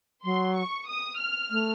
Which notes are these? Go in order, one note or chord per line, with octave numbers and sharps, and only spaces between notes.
F#3 C6
C#6
D#6
F6
A3